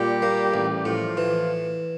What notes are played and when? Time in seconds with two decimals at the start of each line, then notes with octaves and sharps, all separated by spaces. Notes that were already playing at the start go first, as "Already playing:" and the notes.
Already playing: A#2 G3 G4
0.22 A#3
0.54 A1
0.85 A2 F3 F4
1.17 E3